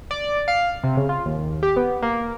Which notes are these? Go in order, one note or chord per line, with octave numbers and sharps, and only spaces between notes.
D5
F5
C3
C#3
F4
D#2
G4
B3
A#3